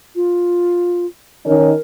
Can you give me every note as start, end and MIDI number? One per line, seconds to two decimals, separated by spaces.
0.16 1.06 65
1.46 1.71 51
1.46 1.71 61
1.46 1.71 63
1.46 1.81 70